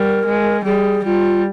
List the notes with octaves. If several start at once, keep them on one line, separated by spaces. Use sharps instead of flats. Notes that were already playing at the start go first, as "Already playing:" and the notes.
Already playing: G3 A#4
G#3
G3 G#4
G3 F4